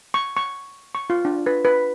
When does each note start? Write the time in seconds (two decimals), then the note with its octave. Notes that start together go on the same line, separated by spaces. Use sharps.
0.14 C#6
0.37 C#6
0.95 C#6
1.10 F4
1.25 D4
1.46 B4
1.65 B4